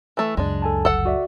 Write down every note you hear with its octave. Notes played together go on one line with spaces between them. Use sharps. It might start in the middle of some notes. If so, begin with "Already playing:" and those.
E3 A3
C#2 F#2 G#3 D4
A4 G#5 A5
G1 A4 F#5
F#4 D5 E5